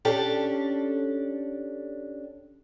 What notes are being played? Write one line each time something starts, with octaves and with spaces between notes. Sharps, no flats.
C#4 D4 G4 A4